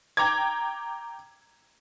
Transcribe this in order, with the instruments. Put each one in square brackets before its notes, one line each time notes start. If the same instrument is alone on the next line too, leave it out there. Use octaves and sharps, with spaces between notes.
[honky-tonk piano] G5 A#5 D6 G#6